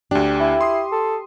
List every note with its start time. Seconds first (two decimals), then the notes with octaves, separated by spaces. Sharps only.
0.11 D2 D4 G4
0.40 E4
0.61 C6 D#6 C7
0.92 A4